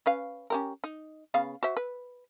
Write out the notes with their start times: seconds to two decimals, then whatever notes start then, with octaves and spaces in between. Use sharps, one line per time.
0.06 C#4 B4 F5
0.50 C#4 G4 A#4
0.84 D#4
1.34 C#3 B3 F5
1.63 F#4 C5 E5
1.77 B4